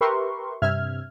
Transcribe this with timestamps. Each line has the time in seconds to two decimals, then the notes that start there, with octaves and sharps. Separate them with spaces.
0.01 G4 A#4 B4 E5 C6 C#6
0.62 G2 C3 E5 F6 G#6